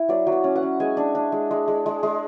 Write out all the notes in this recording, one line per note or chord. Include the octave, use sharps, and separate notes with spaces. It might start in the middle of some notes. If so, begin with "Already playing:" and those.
Already playing: E4
F#3 D5
F#3
D5
C#4
F#5
C#4
G#3 G#5
D4
D4
G#3
G#3
G#3
G#3
G#3